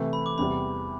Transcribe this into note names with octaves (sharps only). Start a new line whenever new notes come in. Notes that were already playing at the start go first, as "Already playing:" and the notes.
Already playing: C3 E3 A3 E4
B5
D6
E2 C3 G3 B5